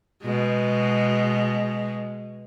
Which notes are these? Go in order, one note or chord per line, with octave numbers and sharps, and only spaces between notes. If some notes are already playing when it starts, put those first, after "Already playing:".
B2 G#3